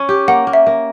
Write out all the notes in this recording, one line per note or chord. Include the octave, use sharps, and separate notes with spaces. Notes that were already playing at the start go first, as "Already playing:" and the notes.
Already playing: C#4
G4
A#3 F#5
A#3
E5
A#3